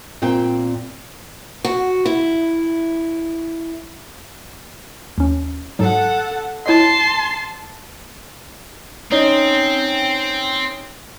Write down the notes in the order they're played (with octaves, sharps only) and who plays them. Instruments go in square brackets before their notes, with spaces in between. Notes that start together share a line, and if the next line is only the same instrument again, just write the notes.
[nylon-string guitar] A#2 C4 F4 G5
[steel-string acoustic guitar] F#4
E4
[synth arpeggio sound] D#2 C#4
[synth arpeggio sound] G#2 F#3 [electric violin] A4 F#5
[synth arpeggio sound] E4 C#5 D#5 [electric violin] A5 C6
[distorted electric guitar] C4 [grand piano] C#4 D#4